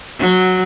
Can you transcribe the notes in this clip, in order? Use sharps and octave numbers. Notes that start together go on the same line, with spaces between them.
F#3